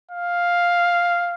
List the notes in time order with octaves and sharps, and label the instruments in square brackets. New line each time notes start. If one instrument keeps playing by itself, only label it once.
[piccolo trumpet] F5